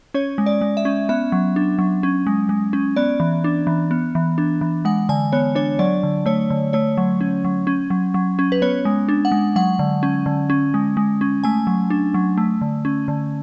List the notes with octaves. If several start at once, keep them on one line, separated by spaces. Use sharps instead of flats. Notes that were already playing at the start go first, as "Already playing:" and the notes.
C#4 C#5
G#3
D5
G#3
E5
C#4
B3 E5
F#3
D4
F#3
C#4
G#3
G#3
C#4
B3 D5
E3
D4
E3
B3
E3
D4
E3
G#3 F#5
D3 G#5
B3 C#5
D4 C#5
F#3 D5
D3
A3 C#5
D3
A3 C#5
F#3
C#4
F#3
C#4
F#3
F#3
C#4
B4
B3 C#5
G#3
D4
F#5
G#3
F#3 F#5
D3
C#4
D3
C#4
G#3
G#3
C#4
A3 G#5
F#3
D4
F#3
A3
D3
C#4
D3